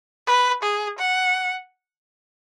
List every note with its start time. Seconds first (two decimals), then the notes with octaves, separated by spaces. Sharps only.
0.27 B4
0.63 G#4
0.99 F#5